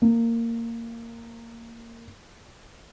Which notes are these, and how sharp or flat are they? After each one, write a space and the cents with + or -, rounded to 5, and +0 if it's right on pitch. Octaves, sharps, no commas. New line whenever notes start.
A#3 -15